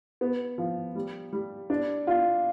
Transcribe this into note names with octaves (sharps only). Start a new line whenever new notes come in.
B3
F3
G3
G3
D4
F4